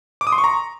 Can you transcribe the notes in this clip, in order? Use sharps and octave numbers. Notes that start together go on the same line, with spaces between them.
D6
D#6
C6
C#6
A#5